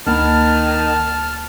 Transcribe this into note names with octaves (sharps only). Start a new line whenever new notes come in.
D2 D#3 A#3 A5 B5 F6